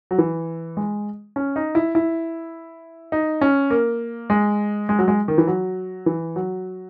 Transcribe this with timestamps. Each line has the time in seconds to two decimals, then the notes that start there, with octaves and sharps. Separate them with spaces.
0.11 F#3
0.18 E3
0.77 G#3
1.36 C#4
1.56 D#4
1.75 E4
1.95 E4
3.12 D#4
3.41 C#4
3.70 A#3
4.30 G#3
4.89 G#3
4.99 F#3
5.08 G#3
5.28 D#3
5.38 E3
5.47 F#3
6.06 E3
6.36 F#3